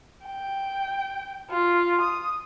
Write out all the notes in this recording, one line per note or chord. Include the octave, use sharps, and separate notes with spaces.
G5
F4
D#6